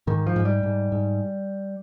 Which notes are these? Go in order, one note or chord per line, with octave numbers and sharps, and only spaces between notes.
G#2 D#3
F3
G#2
G3
G#2
G#2